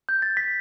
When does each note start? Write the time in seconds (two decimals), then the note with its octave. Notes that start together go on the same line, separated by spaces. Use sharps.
0.09 G6
0.22 A6
0.37 B6